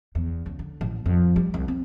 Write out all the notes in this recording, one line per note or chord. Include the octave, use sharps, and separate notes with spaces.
E2
C#2
D3
A1
F2
G3
C2
C4